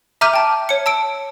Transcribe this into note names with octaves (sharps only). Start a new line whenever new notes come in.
E5 A#5 D6 F6 G6 D#7
G5 A5
C#5 C#7
A5 E6 D7